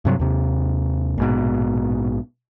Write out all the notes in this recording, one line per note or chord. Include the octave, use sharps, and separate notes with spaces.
G2 C3 F#3
D#2 C3
A#1 G#2 B2